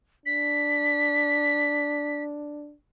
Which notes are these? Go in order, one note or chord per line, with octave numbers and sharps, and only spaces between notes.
D4 B6